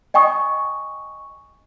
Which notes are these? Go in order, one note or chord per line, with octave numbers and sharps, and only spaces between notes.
D#5 G5 G#5 C#6 D#6